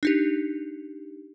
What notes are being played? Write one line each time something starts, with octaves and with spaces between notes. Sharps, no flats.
D4 D#4 G4